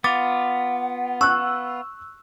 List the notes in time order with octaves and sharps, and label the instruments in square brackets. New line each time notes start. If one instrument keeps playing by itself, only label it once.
[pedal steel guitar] B3 F4 [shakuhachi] F#5 [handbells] D6 A6
[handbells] C#6 [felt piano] E6 F#6